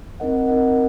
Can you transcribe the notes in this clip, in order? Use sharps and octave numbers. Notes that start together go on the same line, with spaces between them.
C4 D#4 A#4 D#5 F#5
C4 D#4 A#4 D#5 F#5